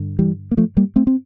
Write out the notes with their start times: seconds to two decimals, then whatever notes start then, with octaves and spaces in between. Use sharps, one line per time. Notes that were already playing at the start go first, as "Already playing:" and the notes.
Already playing: G2 D3
0.19 E3 G3
0.51 A#3
0.57 F3 A3
0.77 G3 A#3
0.96 A3 C4
1.07 C4